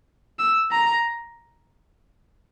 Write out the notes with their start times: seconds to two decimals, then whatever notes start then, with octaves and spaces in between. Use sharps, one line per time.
0.39 E6
0.72 A#5